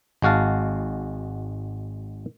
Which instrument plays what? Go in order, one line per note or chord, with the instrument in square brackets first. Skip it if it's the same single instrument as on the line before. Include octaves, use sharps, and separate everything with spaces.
[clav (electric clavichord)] G#1 G#3 F#4 F5 A5